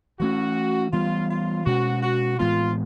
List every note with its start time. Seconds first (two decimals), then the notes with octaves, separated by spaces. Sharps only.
0.20 E3 A3 C#4 F#4
0.93 E3 G3 B3 F4
1.30 F4
1.66 B2 G#3 C#4 F#4
2.02 F#4
2.39 A2 E3 G#3 B3 F4